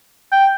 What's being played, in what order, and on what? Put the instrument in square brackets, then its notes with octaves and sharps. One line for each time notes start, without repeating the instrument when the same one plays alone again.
[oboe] G5